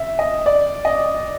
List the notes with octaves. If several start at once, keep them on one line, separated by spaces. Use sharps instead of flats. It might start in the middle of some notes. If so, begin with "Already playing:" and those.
Already playing: E5
D#5
D5
D#5